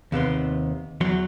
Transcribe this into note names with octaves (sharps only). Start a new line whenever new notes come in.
D#2 C3 B3 C6
E2 F#3 C6